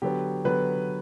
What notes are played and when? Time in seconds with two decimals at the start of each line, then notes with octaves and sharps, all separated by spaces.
0.02 D3 F#3 B3 G4
0.44 D3 F#3 B3 B4